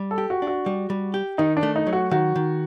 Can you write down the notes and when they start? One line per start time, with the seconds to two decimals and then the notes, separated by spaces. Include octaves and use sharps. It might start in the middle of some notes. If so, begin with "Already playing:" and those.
Already playing: G3
0.11 A4
0.18 G4
0.30 F#4
0.42 D4
0.47 F#4
0.66 G3
0.90 G3
1.14 G4
1.38 D#3 D#4
1.57 D4
1.63 A3
1.76 D#4
1.87 F#3
1.93 F#4
2.11 D#3 F#4
2.36 D#3